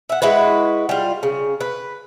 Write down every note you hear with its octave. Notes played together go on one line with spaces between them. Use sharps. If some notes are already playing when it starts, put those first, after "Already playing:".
E5 F#5
G#3 E4 F#4 B4
G3 F4
C#3
B4